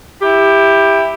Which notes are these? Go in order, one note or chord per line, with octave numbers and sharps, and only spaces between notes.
E4 G4